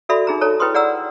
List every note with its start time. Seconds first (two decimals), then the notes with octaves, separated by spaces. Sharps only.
0.09 F#4 A4 D5 E5 B5
0.27 D#4 G#4 A#5
0.41 A4 C#5 A5 A#5
0.60 E4 B4 G5 B5 C6 D#6
0.74 G#4 D5 F#5 A#5 E6